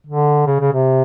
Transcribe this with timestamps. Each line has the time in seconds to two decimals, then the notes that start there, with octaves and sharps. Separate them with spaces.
0.07 D3
0.47 C#3
0.60 C#3
0.73 C3